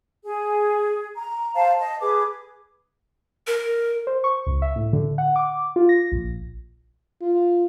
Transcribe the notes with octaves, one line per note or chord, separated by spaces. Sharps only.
G#4
A#5
C5 F5 A5
D#5 A5
G#4 B4 D6
A#4
C5
C#6
C#2
E5
A2
D3
F#5
D6
F4
A#6
A#1
F4